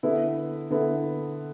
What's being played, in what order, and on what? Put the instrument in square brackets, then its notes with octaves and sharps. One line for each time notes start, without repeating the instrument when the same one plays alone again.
[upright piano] D3 B3 E4
D3 B3 E4